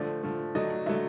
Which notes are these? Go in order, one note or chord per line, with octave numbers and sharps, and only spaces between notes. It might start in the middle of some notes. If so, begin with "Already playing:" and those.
Already playing: D3 F3 A3 D5
D3 F3 A3
D3 F#3 A3 D#5
D3 F#3 A3 E5